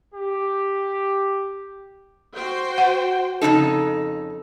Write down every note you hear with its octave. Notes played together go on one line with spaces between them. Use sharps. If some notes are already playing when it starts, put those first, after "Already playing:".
G4
F#4 C5 G5
F#5
F2 A#2 C#3 D#4 A4